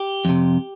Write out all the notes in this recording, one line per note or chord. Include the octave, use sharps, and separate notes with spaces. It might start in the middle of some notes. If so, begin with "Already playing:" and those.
Already playing: G4
F2 C3